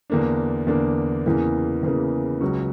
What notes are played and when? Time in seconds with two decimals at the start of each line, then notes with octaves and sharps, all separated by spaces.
0.10 E2 D3 A#3 D4
0.67 E2 D3 A#3 D4
1.26 E2 C#3 E3 A#3
1.83 E2 C#3 E3 A#3
2.41 C#2 C#3 F#3 C#4 F#4